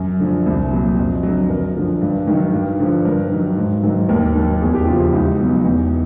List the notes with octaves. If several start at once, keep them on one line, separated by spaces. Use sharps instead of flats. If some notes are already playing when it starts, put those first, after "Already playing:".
Already playing: F#2
D3 F3
C2
A#2 F#3
F2
D3 F#3
F#2 A#4
D3 F3
G2
D#3 F#3
G2
D3 F3
G2 A#4
D#3 F#3
G#2
D#3 F#3
D#2 A#4
D#3 F#3
E2 G#4
G4
C#3 F3 F4
E4
C#2 D#4
B2 F#3
E2